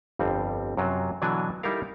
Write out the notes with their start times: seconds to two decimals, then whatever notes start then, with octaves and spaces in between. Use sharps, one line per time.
0.19 G1 F2 G3 C4
0.77 F#2 C3 F#3 F4
1.22 B2 D3 E3 F#3 D4 G#5
1.63 G3 D#4 E4 A4 A#4 F5